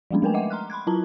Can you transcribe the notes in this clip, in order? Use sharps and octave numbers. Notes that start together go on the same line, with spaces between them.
F3 G3 G#3 A#3 C#4 D4
G#3 A3 A#4 B4 G5 G#5
D#5 E5 F#5 G5 D6
A#5 C6 F6 F#6
B5 C6 F#6 G#6
F#3 E4 F4 A5 A#5